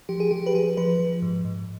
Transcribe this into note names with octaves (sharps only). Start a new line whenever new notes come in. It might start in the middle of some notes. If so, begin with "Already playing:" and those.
F3 G4
G#4
F3 G4
B4
F3 G#4
F3 B4
F3
G#2
G#2